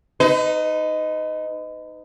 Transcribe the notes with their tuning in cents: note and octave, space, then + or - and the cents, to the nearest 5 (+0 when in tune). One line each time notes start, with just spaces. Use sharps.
D#4 +0 B4 +40